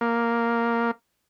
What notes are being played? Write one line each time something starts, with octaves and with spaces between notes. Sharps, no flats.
A#3